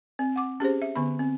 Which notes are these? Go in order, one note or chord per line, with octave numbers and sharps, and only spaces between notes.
C4
F#5 D6
C#4 G4 G#4 C5
E5
D3 B3 B5
C4